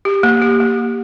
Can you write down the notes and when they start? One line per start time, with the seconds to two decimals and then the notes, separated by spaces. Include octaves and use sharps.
0.05 G4
0.23 A#3
0.42 G4
0.60 A#3
0.78 G4